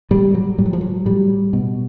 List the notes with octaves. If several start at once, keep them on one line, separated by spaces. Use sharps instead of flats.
A2 G3
F#3
A2 G3
F#3
F3
F#3
A2 G3
B2